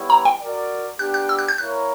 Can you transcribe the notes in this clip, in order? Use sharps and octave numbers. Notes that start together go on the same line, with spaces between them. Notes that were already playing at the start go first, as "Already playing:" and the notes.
Already playing: G3 B3 E4 G4 C#5
A#5
G5
F#4 A#4 D5
B3 D4 G4 F#6
F#6
E6
F#6
G6
A#3 E4 A#4 C#5 F#6